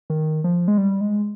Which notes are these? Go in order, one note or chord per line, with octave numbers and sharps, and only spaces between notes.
D#3
F3
G#3
G3
G#3